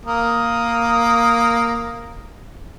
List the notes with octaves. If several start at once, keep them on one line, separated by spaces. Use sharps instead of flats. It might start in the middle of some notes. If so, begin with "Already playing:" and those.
A#3 D#6